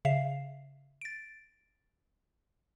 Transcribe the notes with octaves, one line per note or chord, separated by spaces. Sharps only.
C#3 E5 F5 C7
A6 D7